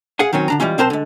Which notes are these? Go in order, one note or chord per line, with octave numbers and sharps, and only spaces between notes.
G#4 F5 F#5 G#5
D#3 F#3 C4 C#4
D3 D4 A#5
E3 G3 G#3 C#4 F4
B1 C4 A#4 C5 A5 C6
D3 G#3